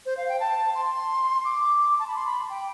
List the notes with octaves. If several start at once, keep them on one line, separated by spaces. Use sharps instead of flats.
C5
F5
G5
A5
C6
D6
A5
B5
C6
B5
G5